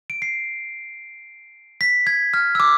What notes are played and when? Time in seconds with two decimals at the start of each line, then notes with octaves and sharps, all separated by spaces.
0.10 D7
0.22 C7
1.81 B6
2.07 G#6
2.34 F6
2.55 E6
2.60 D6